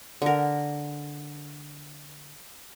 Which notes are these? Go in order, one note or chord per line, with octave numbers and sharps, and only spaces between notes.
D3 A#4